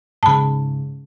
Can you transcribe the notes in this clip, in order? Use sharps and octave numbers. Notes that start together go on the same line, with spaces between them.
G#2 C#3 A5 B5